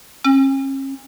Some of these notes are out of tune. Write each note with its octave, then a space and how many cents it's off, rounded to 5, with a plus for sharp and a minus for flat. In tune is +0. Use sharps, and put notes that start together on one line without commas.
C#4 -40